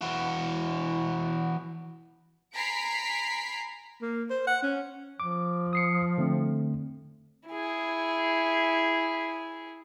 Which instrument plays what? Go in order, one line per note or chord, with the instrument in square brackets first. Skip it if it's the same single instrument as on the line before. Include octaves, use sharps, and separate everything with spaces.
[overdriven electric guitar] E3 F#4
[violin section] G#5 A#5 B5 B6 C7 D7
[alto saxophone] A#3
C5
F#5
C#4
[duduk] F3 [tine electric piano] D6
[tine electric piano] D#6 C7 C#7
D3 A3 C4
[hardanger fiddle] E4 G#4